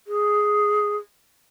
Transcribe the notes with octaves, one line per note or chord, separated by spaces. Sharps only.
G#4